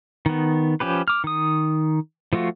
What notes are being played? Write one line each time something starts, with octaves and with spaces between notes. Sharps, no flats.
D#3 B3
F3 C#4 G4 B4
D6 F6
D#3 D#6
F3 A3 F4 F#4